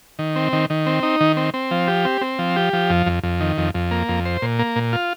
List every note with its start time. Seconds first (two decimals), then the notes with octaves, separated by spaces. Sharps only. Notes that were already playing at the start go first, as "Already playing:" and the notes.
0.19 D#3
0.36 C4
0.53 D#3
0.70 D#3
0.86 C4
1.03 D#4
1.21 D#3
1.37 C4
1.54 C4
1.71 F3
1.88 G4
2.05 C4
2.21 C4
2.39 F3
2.56 G4
2.73 F3
2.90 F2
3.06 F2
3.23 F2
3.40 D#3
3.58 F2
3.75 F2
3.91 A#3
4.09 F2
4.25 C5
4.42 A#2
4.59 A#3
4.76 A#2
4.93 F4